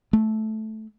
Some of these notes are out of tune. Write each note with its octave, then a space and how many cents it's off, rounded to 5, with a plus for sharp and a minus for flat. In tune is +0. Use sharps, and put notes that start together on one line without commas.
A3 -10